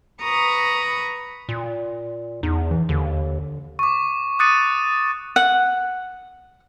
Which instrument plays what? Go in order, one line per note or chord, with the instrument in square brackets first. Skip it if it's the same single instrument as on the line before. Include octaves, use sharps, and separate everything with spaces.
[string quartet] B4 A#5 C#6 D#6
[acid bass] A#2
[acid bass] E2 [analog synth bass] D#4
[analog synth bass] E3
[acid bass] D#2 [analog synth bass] D3
[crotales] C#6 D6
D6 D#6 F#6 A6 C#7 D#7
[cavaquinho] F#5